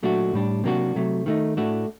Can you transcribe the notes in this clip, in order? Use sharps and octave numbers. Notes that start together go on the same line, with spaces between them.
A#2 F#3 A3 D4 F#4
A2 G3 D4
C3 F#3 A#3 D4 F#4
C3 F#3 A3
D#3 A3 D#4
A2 A3 D4 F#4